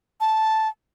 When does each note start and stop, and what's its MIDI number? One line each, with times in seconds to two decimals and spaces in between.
0.21 0.69 81